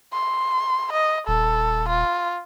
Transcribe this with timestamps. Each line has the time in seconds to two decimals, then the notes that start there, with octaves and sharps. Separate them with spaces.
0.13 C6
0.93 D#5
1.28 D#1 A4
1.89 F4